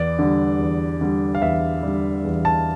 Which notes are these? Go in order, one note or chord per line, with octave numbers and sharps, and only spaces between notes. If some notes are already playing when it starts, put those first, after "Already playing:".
Already playing: E2 D5
D3 G3
E2
D3 G3
F5
E2 E5
D3 G3
E2
A5